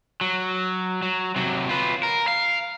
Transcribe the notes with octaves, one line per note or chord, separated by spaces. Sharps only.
F#3
F#3
C3 F#3
F4 B4
A#4
F5